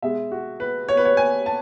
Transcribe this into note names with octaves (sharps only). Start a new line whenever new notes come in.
B2 G#3 E5
F#4
B4
C#5
B4
C#5
G#5
A5